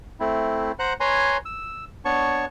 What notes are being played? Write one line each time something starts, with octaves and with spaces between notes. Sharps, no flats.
A3 C4 E4
C5 F#5 A#5 F#6
B4 C#5 G#5 A#5 C6
E6
B3 D4 C#5 A5 C#6